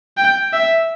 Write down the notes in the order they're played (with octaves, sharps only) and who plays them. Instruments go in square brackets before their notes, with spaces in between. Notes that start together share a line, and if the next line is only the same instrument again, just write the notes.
[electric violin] G5
E5